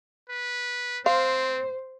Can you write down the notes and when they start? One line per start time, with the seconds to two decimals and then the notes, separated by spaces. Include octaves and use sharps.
0.30 B4
1.06 C4 C5 F5 C6